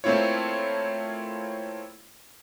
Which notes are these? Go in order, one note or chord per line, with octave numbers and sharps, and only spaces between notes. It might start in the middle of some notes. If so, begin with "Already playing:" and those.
A3 A#3 C4 E4 F4 C#5